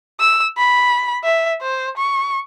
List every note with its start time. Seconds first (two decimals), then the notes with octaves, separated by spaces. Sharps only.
0.20 E6
0.58 B5
1.24 E5
1.61 C5
1.97 C#6